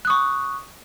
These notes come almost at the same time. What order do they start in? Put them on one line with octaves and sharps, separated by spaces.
F#6 D#6 C#6